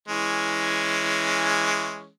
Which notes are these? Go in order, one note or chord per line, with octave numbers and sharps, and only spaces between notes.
E3 G#3 C#4